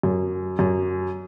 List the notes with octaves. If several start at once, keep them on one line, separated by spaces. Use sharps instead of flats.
F#2
F#2